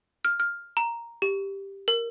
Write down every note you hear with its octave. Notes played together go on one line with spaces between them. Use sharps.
F6
F6
A#5
G4
A#4